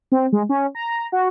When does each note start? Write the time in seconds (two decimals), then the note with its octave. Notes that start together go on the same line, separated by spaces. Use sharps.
0.12 C4
0.32 G#3
0.49 C#4
0.75 A#5
1.12 F#4